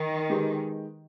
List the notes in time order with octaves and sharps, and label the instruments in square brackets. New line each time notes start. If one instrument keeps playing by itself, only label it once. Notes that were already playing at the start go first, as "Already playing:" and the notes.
Already playing: [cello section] D#3
[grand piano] G#3 D#4 G4 B4